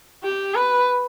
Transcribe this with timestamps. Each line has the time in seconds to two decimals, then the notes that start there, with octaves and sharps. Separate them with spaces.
0.23 G4
0.55 B4